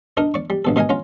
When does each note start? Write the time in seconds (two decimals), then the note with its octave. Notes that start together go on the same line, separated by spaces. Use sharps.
0.17 D4 D#4 A#4
0.34 D5 C#6
0.50 G3
0.65 A#1 B2 A4
0.76 B2 D#4 A#4 D#5 G#5
0.89 C#4 F4 A#5